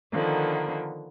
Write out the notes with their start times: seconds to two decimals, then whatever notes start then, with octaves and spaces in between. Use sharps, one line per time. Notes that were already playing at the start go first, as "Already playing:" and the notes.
0.11 D3 D#3 F3 A#3 B3